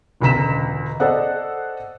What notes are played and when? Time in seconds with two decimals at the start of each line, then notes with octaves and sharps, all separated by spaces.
0.21 E1 C#2 D3 A#5 B6 E7
1.00 A4 C5 D5 D#5 F#5